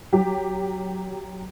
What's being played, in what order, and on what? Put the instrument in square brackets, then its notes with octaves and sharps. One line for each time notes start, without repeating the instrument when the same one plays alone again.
[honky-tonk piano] F#3 G4